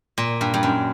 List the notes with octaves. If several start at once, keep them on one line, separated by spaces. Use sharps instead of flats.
A#2
G2
G2
F#2